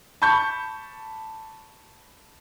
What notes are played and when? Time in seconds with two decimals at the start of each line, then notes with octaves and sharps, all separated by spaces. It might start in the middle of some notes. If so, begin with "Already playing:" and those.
0.22 A5 B5 C#6 G6